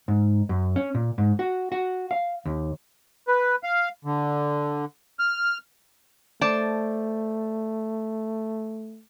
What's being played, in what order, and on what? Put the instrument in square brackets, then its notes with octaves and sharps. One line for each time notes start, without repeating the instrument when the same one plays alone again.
[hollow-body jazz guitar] G#2
F#2
C#4
A#2
G#2
F#4
F#4
F5
D#2
[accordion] B4
F5
D3
F6
[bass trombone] A3 [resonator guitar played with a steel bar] C5 D5 A5